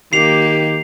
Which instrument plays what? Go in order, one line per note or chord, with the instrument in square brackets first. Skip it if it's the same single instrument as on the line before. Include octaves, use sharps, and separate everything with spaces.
[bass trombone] D#3 [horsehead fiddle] A#3 G4 [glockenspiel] C7 F7